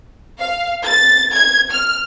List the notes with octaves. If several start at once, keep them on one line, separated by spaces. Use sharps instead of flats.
F5
A6
G#6
F6